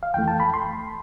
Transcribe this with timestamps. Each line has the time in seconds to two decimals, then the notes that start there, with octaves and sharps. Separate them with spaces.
0.03 F5
0.14 F2 E3 A3 G5
0.28 A5
0.40 B5
0.54 C6